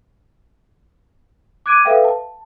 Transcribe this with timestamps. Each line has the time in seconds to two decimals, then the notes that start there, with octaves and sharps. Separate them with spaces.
1.66 D6 F#6 G#6 D7 D#7
1.85 A4 B4 E5 F5 G5
2.04 A5